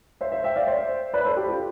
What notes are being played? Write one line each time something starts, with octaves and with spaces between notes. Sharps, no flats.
C5 E5
C5 E5
E5 G5
D5 F5
C5 E5
B4 D5
A4 C5
G4
F4